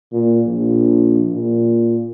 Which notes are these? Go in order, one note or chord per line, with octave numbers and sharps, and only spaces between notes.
A#2
A#1
A#2